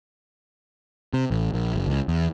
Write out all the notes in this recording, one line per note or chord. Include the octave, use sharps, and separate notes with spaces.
C3
A1
A#1
F#1
C#2
E2